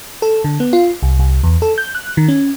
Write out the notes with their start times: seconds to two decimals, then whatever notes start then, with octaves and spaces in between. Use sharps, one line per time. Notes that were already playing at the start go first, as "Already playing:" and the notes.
0.22 A4
0.44 D3
0.60 B3
0.73 F4
1.02 C2
1.19 C2
1.43 E2
1.62 A4
1.78 G6
1.95 F#6
2.17 D#3
2.28 C#4